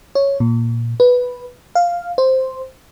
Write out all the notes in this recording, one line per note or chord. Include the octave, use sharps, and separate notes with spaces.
C#5
A#2
B4
F5
C5